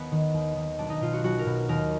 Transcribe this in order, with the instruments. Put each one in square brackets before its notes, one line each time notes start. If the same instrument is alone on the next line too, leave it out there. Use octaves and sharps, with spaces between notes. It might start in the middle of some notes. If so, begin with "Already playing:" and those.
Already playing: [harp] D#2 B3
D#3
D#2
D#3
B1 D4
D#4
B2 F4
F#4
B1 F#4
A#4
B2
D#2 A#4